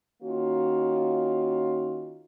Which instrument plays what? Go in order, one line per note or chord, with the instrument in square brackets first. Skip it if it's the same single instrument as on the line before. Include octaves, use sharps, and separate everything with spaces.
[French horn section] D#3 A#3 C#4 F4 F#4